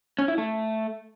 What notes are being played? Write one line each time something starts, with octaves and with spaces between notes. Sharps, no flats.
C#4
E4
A3